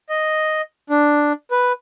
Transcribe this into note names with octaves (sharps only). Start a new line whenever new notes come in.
D#5
D4
B4